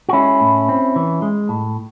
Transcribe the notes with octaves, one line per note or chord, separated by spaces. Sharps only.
F#4
G#3 C#4 E4
A2
C4
E3
G#3
A2